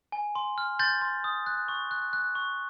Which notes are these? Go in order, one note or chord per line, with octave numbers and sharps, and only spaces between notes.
G#5
C6
F6
C6 G6 A6
C6
D#6
F#6
C#6
F#6
F#6
C#6